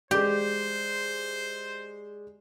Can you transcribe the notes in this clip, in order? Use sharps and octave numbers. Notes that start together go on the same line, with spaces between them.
G#3 G4 C5 D5